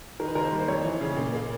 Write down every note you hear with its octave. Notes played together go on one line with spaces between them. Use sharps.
D#3 A#4
B4
D#2 A#4
C5
G3
C5
F2 C#5
E3
C#3
A#2
A#3